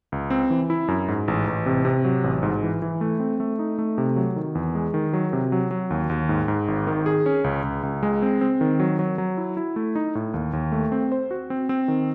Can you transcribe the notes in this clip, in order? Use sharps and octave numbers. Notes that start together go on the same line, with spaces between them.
C#2
C4
E3
E4
F#2
G#2
A1
A1
C3
C3
F#3
A1
G#2
E3
E3
A3
C4
A3
D#4
A3
C3
F#3
D#3
E2
G#3
D#3
F#3
C3
F#3
F#3
D#2
D#2
G#2
G#2
G#1
D#3
G#4
C#4
C#2
C#2
C#2
G#3
C4
C4
D#3
F#3
F#3
F#3
E4
E4
A3
D#4
A2
D#2
D#2
A3
C4
C5
F#4
C4
C4
D#3